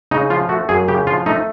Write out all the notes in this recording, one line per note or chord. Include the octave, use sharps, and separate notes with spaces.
C#3 D#4
F3 F4
A3 F#4
F#2 G#4
C#3 G4
F3 F4
A3 D#4